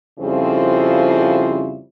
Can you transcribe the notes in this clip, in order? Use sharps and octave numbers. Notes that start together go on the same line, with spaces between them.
F2 C#3 F3 G3 C4 E4